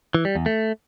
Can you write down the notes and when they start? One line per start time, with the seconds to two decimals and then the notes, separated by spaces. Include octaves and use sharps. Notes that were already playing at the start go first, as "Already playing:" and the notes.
0.15 E3
0.25 G3
0.35 E2
0.46 A3